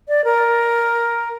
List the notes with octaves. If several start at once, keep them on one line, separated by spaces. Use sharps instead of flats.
D5
A#4